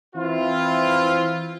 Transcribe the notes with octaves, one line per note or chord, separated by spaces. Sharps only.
E3 C4 E4 F4